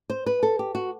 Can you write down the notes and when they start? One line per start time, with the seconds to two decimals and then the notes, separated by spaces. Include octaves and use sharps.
0.10 C5
0.26 B4
0.43 A4
0.59 G4
0.75 F#4